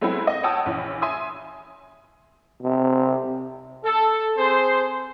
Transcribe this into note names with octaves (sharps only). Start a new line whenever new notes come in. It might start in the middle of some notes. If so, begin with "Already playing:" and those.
F#3 G#3 A3 B3 C4 E4
D#5
C#5 F#5 G5 A5 D#6 E6
A#1 E3 C#4
E5 G#5 C6 D#6
C3
A4
C4 G#4 C5